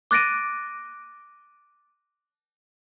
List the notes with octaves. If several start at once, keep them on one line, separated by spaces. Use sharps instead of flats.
D6 F#6 A6 A#6 D7 D#7